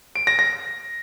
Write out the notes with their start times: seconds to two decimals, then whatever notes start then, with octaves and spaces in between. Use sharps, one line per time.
0.15 D7
0.27 A#6
0.39 A#6